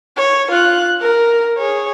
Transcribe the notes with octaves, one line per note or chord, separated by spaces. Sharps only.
C#5
F4 F#6
A#4
G#4 C#5